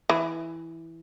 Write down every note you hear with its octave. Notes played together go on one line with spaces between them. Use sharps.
E3